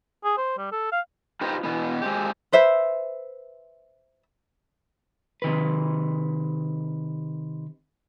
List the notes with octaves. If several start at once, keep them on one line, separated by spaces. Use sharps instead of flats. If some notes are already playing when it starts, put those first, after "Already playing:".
G#4
C5
G3
A4
F5
D#4 F4 G4 B4 C5 D#5
B2 E3 B3
G#3 C4 G4
B4 C5 E5
C3 D#3 B4